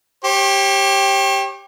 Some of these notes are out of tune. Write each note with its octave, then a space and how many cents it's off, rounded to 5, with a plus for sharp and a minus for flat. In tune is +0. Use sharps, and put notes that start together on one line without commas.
G4 +0 C#5 -40